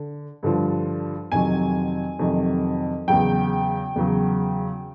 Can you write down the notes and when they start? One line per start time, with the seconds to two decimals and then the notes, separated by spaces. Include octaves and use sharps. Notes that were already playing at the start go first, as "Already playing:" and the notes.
Already playing: D3
0.43 G2 D3 F3
1.32 F2 C3 D#3 F#3 G#5
2.19 F2 C3 D#3 F#3
3.07 E2 C#3 F#3 G5
3.96 E2 C#3 F#3